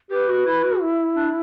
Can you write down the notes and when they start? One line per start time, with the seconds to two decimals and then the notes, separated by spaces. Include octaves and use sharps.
0.10 G4 B4
0.28 F#4
0.46 E4
0.63 F#4
0.81 E4
1.16 D4